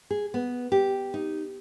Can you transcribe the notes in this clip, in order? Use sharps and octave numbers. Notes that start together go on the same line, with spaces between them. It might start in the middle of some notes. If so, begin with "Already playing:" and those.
G#4
B3
G4
D#4